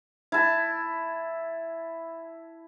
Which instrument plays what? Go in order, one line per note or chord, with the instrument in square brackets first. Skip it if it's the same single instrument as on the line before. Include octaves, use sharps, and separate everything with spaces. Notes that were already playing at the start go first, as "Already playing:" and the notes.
[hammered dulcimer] E4 A5